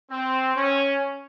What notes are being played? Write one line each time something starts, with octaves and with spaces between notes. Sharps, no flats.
C4
C#4